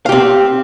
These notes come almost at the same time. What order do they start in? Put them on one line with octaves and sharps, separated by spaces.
F5 G4 C4